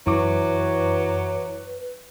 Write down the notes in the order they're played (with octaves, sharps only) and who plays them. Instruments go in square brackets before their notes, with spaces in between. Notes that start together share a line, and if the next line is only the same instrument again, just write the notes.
[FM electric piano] F#2 D6 [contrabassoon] E3 [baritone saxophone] F#3 [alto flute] B4